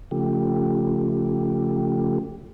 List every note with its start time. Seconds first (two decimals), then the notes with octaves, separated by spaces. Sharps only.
0.11 C#3 F3 A3 G4